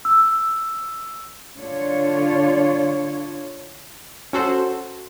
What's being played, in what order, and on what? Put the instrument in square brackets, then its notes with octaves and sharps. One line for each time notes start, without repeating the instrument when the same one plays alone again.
[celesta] E6
[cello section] D3 D4 F4 C#5
[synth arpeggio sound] C#4 F#4 A4 C5